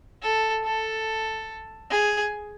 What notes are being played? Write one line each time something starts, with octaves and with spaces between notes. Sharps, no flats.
A4
A4
G#4